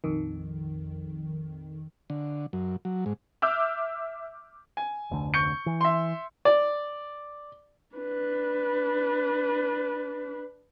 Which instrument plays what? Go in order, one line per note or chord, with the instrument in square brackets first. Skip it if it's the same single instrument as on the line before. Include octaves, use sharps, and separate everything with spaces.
[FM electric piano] A#1 F2 D#3
[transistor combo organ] D3
F#2
F#3
G#2
[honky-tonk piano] E5 D6 E6 F6 G6
[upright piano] G#5
[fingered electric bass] F1 D2 D3
[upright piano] C#6 G6 C#7
[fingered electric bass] E3
[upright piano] E5 C6
[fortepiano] D5
[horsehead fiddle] D4 B4